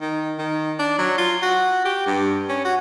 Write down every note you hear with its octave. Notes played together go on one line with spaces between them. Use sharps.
D#3
D#3
D4
F#3
F4
F#4
G4
G2
C#4
F#4